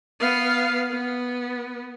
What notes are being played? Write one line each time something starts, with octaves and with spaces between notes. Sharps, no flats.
B3 F5
B3